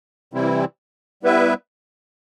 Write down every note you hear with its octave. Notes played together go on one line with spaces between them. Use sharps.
C3 E3 G3 C4 E4
G3 B3 E4 B4 E5